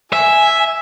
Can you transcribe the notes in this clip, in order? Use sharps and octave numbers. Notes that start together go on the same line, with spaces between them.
E5 G#5